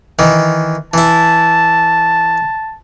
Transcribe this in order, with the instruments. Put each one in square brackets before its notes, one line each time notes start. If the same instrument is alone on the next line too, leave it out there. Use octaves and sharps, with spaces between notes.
[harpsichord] D#3 E3
[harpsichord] E3 E4 [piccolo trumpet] A5